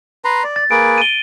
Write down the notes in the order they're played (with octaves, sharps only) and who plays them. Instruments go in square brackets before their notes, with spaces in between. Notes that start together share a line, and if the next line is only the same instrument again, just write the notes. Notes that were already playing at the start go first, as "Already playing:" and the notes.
[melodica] B4 A#5 C6
D5
[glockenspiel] A6
[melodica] A#3 G#4 B4 [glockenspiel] D7
[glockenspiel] D#7 G7